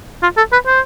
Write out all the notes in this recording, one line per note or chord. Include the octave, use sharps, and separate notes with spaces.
F4
A4
B4
C5